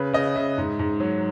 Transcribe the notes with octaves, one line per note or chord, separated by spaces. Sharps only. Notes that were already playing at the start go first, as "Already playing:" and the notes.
Already playing: C#3 B4
C#3 D#5
C#3 E5
G#2
G#2
F#3